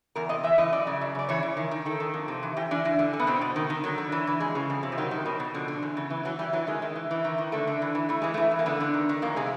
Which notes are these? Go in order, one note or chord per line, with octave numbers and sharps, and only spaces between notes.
E2 A#4
C3 D#5
E3 E5
E3 D#5
F#2 D5
C#3
F#2
C#3 D5
E3 C#5
E3
D#3
D#3
D#3 A4
D#3
F2
C3
E3
E3 G4
E3 D4
E3
D3
D3
B3
B2 C4
B2
D#3
D#3
D3 F#3
D3
E3
E3
F2 G#3
C#3
F2
C3
F3
D#3 F#3
D#3
B2
B2
D3 F3
D3
E2
C#3
E3
E3 F#3
E3 G3
E3 F#3
D#3 G#3
D#3
E3
E3
D#3
D#3
D3 A3
D3
E3
E3
E3 A3
E3 G#3
E3 A3
E3
A#3
D3 B3
D3
D#3
D#3
F2 A#3
C3 G#3